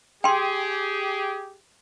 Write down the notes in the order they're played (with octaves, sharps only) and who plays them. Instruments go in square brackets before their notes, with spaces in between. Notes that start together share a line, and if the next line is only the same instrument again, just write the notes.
[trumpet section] G4 G#4 [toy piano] G5 C6